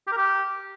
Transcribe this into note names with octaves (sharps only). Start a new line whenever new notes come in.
G4
A#4
G4